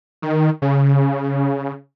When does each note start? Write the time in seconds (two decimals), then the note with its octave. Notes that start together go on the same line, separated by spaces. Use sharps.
0.22 D#3
0.62 C#3